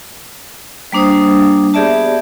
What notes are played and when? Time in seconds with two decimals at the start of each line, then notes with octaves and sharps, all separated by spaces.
0.92 G3 A#3 D4 C5 D#6
1.74 B3 G4 G#4 D5 E5 A5